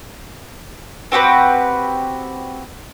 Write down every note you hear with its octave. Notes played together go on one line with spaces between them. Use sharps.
C4 F#4 G4 B4